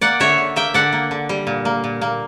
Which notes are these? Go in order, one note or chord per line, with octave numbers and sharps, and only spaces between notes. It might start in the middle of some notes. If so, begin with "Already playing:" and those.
A#3 D5 F#5
D3 C#5 E5
D3
A#3 E5 G5
D3 D5 F#5
A#3
D3
G3
A#2
A#3
A#2
A#3